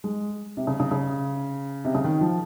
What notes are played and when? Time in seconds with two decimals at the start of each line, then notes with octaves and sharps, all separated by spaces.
0.04 G#3
0.57 C3
0.67 C#3
0.80 C#3
0.91 C#3
1.85 C3
1.95 C#3
2.04 D#3
2.21 F3